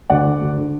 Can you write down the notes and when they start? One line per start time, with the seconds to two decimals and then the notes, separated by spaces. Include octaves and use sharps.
0.10 D2 D5 F#5
0.25 D3
0.41 D2
0.58 D3